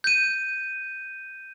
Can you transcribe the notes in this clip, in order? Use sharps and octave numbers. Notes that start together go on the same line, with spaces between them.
G6 D#7